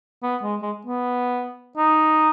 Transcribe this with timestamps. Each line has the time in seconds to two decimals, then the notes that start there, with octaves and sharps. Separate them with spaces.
0.23 B3
0.42 G#3
0.62 G#3
0.87 B3
1.77 D#4